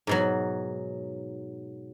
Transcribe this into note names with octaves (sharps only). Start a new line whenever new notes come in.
G#2 B2 F#3